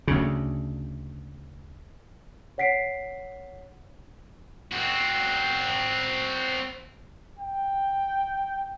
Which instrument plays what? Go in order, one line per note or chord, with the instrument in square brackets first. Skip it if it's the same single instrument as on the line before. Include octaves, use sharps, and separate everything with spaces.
[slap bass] D2 C#3
[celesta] C#5 F#5 B6 C7 D7
[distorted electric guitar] C4 F#4
[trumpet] G5